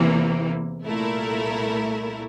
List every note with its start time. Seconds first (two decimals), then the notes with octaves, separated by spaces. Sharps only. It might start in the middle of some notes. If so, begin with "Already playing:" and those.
Already playing: E2 C3 E3 A#3
0.83 C2 A#2 A3 E4 A#4